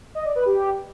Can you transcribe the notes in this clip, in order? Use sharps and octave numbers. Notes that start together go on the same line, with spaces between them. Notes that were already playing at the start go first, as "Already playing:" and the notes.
D#5
D5
B4
G4